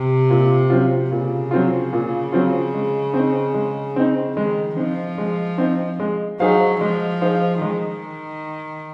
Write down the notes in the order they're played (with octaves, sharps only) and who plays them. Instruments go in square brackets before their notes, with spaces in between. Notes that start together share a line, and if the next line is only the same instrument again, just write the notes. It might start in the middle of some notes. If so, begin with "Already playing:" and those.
Already playing: [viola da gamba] C3
[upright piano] A#2
F#3 C4 F4
[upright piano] A#2 [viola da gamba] C#3
[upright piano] F#3 C4 F4
A#2
F#3 C4 F4
G#3
C4
D#4
G#3
C4 D#4
[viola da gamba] D#3 [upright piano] G#3
[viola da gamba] F3 [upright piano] C4 D#4
[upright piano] G#3
C4 D#4
G#3
[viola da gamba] F#3 [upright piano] D#4 G#4 C5 F5
[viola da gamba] F3 [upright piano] G#3
[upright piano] D#4 G#4 C5 F5
[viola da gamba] D#3 [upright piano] G#3